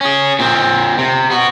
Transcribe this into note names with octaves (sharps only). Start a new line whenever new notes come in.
C#4 G#4
A#2 C4
C3
B3 F#4